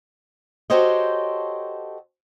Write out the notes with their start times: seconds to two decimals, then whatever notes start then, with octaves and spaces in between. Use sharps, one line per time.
0.70 F#4 G4 A4 C5 C#5 D#5